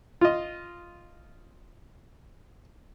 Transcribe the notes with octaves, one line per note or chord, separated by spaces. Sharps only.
F4 D#5